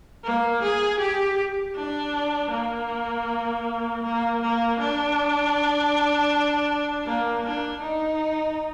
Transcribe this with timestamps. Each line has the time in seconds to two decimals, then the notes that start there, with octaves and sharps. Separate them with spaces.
0.24 A#3
0.62 G#4
1.00 G4
1.76 D4
2.51 A#3
4.03 A#3
4.41 A#3
4.79 D4
7.07 A#3
7.45 D4
7.82 D#4